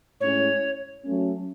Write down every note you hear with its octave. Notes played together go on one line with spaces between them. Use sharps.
A2 G#3 C#4 E4 C#5
F#3 A3 C#4